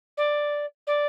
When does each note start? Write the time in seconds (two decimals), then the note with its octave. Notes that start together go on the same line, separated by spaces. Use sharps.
0.17 D5
0.87 D5